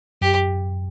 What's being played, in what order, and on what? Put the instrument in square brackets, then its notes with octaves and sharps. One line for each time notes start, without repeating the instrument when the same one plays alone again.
[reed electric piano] F#2 [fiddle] G4